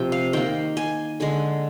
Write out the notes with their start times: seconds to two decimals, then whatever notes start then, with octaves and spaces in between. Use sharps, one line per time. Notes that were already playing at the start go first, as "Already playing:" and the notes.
Already playing: C3 F3 G5
0.12 F5
0.33 D#3 A#3 G5
0.77 G#5
1.20 D3 G#3 G#5